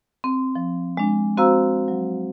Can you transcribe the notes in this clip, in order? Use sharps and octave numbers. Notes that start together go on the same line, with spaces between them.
C4
F3
G#3 D4
C4 F#4 C5 F5 A#5 E6
F#3